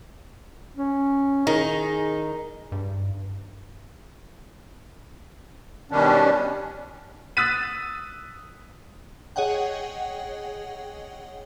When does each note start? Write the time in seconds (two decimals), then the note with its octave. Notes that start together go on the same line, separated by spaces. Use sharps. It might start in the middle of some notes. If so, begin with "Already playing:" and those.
0.77 C#4
1.47 D#3 D#4 G#4
2.72 G2
5.91 B2 D#3 G3 C#4 D4
7.37 D#6 E6 F#6 A6 B6 D#7
9.36 G#4 C#5 D#5 F#5 G5